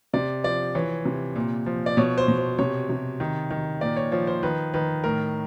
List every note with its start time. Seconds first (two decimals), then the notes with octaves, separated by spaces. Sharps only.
0.13 C3 D5
0.44 F3 D5
0.75 E3 C#5
1.05 C3
1.35 A#2
1.66 F3
1.86 D5
1.97 B2 C#5
2.18 C5
2.28 B2
2.38 C5
2.59 C3 C#5
2.89 C3
3.20 D#3
3.51 D#3
3.81 A#2 D5
3.96 C#5
4.12 F3 C#5
4.27 C5
4.43 D#3 B4
4.74 D#3 B4
5.04 A2 A#4